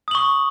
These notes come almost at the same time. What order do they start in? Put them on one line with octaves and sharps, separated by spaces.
D#6 F#7 C#6